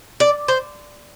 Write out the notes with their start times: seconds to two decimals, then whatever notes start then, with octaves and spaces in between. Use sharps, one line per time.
0.20 D5
0.48 C5